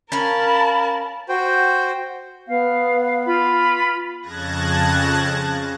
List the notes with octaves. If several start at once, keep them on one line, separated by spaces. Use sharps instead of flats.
C#4 A#4 F5 A5 B5
F#4 C5 G5
B3 F5
F4 B5
F2 C#3 A5 F#6 G#6 A#6